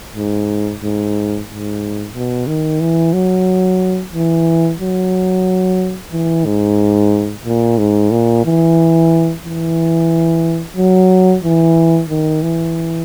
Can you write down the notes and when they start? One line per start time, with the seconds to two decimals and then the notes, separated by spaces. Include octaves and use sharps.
0.15 G#2
0.82 G#2
1.48 G#2
2.14 B2
2.47 D#3
2.81 E3
3.14 F#3
4.14 E3
4.80 F#3
6.12 E3
6.45 G#2
7.45 A#2
7.78 G#2
8.11 A#2
8.45 E3
9.44 E3
10.77 F#3
11.43 E3
12.10 D#3
12.42 E3